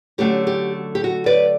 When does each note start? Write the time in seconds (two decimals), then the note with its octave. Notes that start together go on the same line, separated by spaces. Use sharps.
0.18 D3 F#3 A3 C#4 G4
0.47 G4
0.95 G4
1.04 F#4
1.26 B4 D5